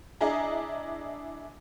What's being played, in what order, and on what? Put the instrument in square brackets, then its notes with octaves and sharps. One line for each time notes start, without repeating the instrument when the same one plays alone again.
[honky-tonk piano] D4 E4 G#4 D#5 A#5